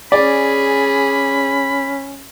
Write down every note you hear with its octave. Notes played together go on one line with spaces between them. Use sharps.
C#4 G#4 D5 B5